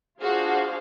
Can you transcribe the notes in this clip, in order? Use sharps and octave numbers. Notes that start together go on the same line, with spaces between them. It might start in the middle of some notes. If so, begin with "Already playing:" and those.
D4 F4 F#4 G#4 C5 F5